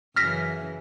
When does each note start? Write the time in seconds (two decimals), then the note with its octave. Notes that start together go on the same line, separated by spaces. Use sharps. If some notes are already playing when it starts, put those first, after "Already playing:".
0.16 F#2 C#3 E3 F6 A#6 B6